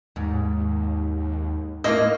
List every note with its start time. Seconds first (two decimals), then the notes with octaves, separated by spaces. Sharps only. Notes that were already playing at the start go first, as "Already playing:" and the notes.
0.16 D#2 G#2
1.84 A3 A#3 E4 F4 D#5